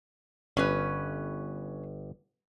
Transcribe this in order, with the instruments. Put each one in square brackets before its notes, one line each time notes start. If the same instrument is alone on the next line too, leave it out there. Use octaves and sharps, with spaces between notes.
[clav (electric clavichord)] G1 [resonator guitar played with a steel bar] C#4 B4